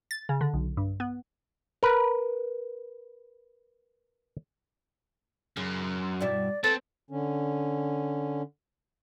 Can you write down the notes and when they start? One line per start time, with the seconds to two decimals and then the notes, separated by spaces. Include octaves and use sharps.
0.11 A6
0.29 C#3
0.41 D3
0.54 B1
0.77 G2
1.00 B3
1.83 A#4 B4
5.57 F#2 C#3
6.21 G2 B2 E4 D5
6.64 C4 A4 B4 C5
7.10 D3 C#4